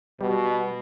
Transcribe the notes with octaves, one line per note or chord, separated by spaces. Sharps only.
B2 G3